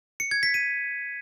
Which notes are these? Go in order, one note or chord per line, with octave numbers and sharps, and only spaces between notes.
C#7
G#6
B6
D#7